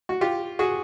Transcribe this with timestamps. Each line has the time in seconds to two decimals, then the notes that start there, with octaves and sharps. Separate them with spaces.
0.09 F#4
0.21 F4 G4
0.59 F#4 G#4